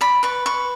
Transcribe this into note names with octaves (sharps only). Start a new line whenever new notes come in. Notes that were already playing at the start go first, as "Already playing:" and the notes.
D5 B5
B4 C#6
B4 C#6